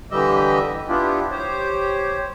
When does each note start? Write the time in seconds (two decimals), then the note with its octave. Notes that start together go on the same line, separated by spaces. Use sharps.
0.11 D3 E3 G3 G4 D#5 E5
0.88 B3 D4 E4 F4 G4
1.31 G4 C5 C#5